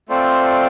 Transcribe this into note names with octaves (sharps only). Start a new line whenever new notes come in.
A3 C4 F4 C5 D5